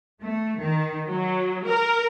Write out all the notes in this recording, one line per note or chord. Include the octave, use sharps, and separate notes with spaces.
A3
D#3
F#3
A#4